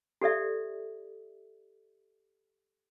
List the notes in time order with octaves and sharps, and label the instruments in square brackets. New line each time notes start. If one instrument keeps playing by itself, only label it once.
[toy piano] G4 A4 D5 E5